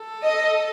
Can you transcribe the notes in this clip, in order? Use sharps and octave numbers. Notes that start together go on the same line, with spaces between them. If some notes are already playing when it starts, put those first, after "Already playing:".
Already playing: A4
D#5